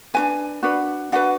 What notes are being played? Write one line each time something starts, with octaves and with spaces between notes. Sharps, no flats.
D4 F#4 B4 G#5
D4 F#4 B4
D4 F#4 B4 F#5